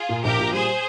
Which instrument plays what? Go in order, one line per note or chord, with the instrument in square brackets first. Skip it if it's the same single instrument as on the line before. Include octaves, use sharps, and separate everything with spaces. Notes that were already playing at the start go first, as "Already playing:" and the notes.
Already playing: [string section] F4 G#4
[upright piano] A#2
[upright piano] A#1 [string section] G4 A#4
[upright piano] A#2
[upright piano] G3 [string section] G#4 C5